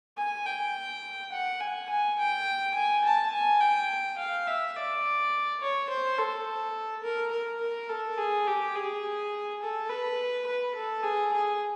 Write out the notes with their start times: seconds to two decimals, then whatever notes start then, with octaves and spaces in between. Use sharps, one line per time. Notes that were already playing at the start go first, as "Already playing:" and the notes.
0.18 G#5
0.46 G5
1.32 F#5
1.61 G#5
1.89 G#5
2.19 G5
2.75 G#5
3.04 A5
3.33 G#5
3.61 G5
4.18 F5
4.47 E5
4.76 D5
5.60 C#5
5.90 C5
6.18 A4
7.03 A#4
7.32 A#4
7.61 A#4
7.89 A4
8.18 G#4
8.47 G4
8.75 G#4
9.62 A4
9.89 B4
10.47 B4
10.75 A4
11.03 G#4
11.33 G#4